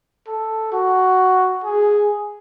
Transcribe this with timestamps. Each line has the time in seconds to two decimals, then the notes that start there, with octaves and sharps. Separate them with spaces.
0.28 A4
0.72 F#4
1.64 G#4